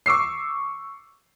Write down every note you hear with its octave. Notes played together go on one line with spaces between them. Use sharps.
C#6 D6 E6 C7